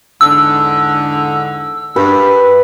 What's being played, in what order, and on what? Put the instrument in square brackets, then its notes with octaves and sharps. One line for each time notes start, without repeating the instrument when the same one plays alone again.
[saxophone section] E2 G#2 D3 [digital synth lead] E6
[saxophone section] G2 [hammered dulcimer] B4